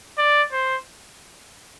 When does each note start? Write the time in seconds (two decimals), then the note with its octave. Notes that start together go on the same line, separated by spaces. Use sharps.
0.18 D5
0.52 C5